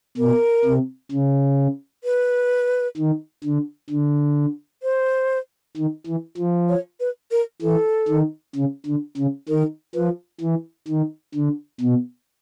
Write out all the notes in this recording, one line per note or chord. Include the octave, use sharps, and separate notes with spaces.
B2 A#4
C3
C#3
B4
D#3
D3
D3
C5
D#3
E3
F3
C#5
B4
A#4
E3 A4
D#3
C#3
D3
C#3
D#3 A#4
F3 B4
E3
D#3
D3
B2